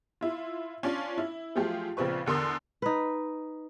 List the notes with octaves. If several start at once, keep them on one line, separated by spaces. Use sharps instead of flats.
E4 F4
C#4 D4 F4
E4
F3 F#3 A3 F4 G4 G#4
A#1 C#3 F3 C4 B4 C#6
E2 D3 A#4 C6 D#6
D#4 B4